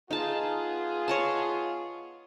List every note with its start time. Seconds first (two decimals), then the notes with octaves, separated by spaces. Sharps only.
0.11 B3 D#4 F4 G#4 A5
1.08 C#5 D#5 A5